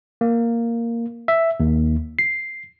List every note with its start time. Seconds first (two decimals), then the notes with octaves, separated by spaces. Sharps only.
0.21 A#3
1.28 E5
1.60 D#2
2.19 C7